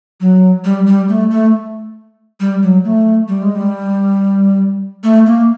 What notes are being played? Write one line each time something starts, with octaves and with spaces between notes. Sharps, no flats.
F#3
G3
G3
A3
A3
G3
F#3
A3
G3
G#3
G3
A3
A#3